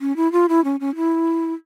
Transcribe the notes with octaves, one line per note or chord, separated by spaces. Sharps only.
C#4
E4
F4
E4
C#4
C#4
E4